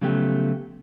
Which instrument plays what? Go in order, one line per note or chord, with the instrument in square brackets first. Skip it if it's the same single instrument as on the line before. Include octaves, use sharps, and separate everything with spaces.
[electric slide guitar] C#3 F3 F#3 A3 B3 G4